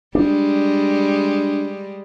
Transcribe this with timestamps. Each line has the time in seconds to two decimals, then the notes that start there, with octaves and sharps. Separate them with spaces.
0.15 G3 G#3 D4